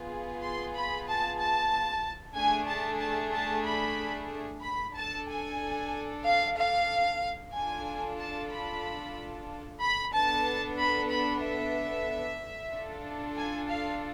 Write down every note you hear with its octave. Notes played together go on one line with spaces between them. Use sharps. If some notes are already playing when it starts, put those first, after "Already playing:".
Already playing: B3 F4 G#4
C6
B5
A5
A5
A3 D4 G#4 G#5
A5
A5
A5
B5
B5
D4 A4 A5
G#5
F5
F5
D4 F4 A4 G#5
A5
B5
B5
B3 D4 A4 A5
B5
B5
E5
D4 F4 A4
G#5
F5